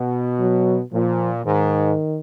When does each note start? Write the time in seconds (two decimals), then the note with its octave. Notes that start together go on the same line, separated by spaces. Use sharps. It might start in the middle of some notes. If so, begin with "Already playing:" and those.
Already playing: B2
0.40 F#3
0.92 A#2 F3
1.45 G#2 D#3